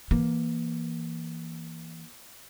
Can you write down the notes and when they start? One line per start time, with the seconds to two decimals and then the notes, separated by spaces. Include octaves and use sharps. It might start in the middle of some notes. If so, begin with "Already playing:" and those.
0.11 E3 A#3